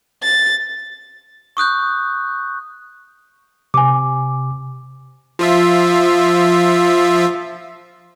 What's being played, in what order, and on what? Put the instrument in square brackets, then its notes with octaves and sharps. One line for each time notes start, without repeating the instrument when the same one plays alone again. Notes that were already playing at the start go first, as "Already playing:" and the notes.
[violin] A6
[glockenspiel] C#6 D#6 F#6 G6
[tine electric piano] C3 [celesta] G#5 D6
[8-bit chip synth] F3 F4 E5